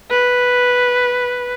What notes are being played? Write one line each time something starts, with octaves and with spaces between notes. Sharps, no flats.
B4